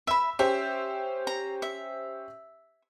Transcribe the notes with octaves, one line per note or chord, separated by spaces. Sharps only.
E5 B5 E6
C#4 G4 C5 E5
A#5
E5